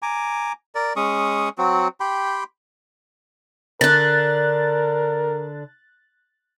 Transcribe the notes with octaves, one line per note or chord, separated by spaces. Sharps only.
G#5 A#5 D6
A#4 D5
G#3 C#4 C#6 D#6
F#3 C4 F#4
G4 G5 B5 C6
D3 D4 A#4 F#6 A6